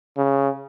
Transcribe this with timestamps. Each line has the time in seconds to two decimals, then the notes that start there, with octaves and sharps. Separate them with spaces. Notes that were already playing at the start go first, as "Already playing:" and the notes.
0.17 C#3